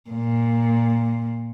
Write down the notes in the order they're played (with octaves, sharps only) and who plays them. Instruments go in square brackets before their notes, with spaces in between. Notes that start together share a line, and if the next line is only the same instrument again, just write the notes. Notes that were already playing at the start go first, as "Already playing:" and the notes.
[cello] A#2